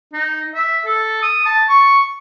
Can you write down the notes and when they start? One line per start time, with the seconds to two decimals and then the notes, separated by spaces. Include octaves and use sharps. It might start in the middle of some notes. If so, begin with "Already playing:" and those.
0.13 D#4
0.54 E5
0.85 A4
1.22 D#6
1.46 A5
1.69 C#6